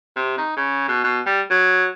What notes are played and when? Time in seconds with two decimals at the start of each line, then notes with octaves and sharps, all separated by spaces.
0.16 C3
0.38 D#4
0.57 C#3
0.88 B2
1.04 B2
1.26 G3
1.50 F#3